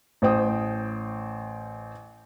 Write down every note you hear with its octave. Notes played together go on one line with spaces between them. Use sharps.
A1 C5 G5 D#6